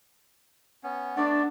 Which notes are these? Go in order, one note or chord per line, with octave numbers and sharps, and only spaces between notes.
B3 C#4
A3 B3 D4 D5